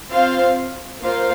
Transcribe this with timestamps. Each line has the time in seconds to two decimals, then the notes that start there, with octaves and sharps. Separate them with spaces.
0.11 C4 F4 C5 F5
1.01 A#3 F4 C5 F5